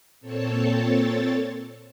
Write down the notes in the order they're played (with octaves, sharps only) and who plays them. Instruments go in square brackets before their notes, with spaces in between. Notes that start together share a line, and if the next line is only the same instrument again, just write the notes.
[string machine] A#2 C4 A4 C#5 A5